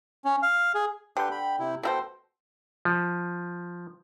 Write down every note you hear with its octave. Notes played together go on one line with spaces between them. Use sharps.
C#4
F5
G#4
D3 G4 B4 G5 G6
B5
C3 E4
B2 E4 A4 C5 G5
F3